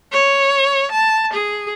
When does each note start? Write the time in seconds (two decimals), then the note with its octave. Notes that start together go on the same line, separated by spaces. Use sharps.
0.12 C#5
0.91 A5
1.33 G#4